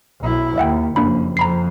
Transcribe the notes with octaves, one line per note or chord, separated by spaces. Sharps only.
B1 E4
D#2 E5 F#5 G5
F#1 F2 A#3 D4 B5
F2 A#5 B5 C7